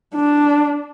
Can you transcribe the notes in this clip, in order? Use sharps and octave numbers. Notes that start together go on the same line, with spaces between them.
D4